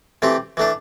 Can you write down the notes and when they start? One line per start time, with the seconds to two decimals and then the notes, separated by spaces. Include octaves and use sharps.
0.22 E3 A3 C4 G4
0.57 E3 A3 D4